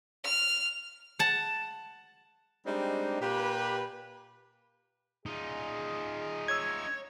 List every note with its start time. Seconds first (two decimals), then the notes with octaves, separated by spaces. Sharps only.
0.24 F6
1.19 F#5 A5
2.66 G3 G#3 C4 D4 D#4 G4
3.21 A#2 G4 B4
5.26 D#4 F4 G#4 D#5
6.48 C#5 E6 G#6